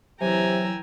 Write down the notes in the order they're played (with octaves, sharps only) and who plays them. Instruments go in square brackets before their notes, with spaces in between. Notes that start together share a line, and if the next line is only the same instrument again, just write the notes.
[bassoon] C3 [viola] E3 A#5 [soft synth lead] F#3 [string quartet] G5 G#5 E6